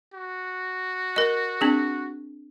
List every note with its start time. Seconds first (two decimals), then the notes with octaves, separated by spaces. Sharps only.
0.14 F#4
1.16 A#4 D#5
1.61 C4 D4 G#4